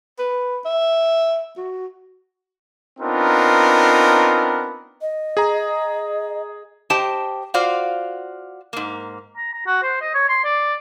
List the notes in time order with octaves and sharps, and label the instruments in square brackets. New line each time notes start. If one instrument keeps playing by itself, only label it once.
[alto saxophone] B4
E5
F#4
[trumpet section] B3 C4 D4 D#4 F4 A#4
[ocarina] D#5
[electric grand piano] G#4 A#5
[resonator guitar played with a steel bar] G4 C5 D#5 G5 A5
F4 F#4 C5 D5 F5
G#2 A#3
[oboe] A#5
A#5
F#4
C5
D#5
C#5
C6
D5